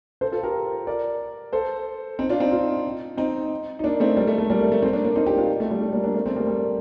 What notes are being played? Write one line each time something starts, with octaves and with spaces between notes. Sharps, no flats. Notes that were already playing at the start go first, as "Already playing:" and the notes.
A4 C5
F4 A4
G4 A#4
A#4 D5
A4 C5
C4 D#4
D4 F4
C4 D#4
D4 F4
C4 D#4
D#4
A#3 D4
A3 C4
G3 A#3
A3
A3
G3 A#3
A3
A3
A3 C4
A#3 D4
A#3 D4
C4 D#4
D#4 G4
D4 F4
A3
G3
A3
G3 A#3
A#3 D4
A3 C4
A3 C4
G3 A#3
G3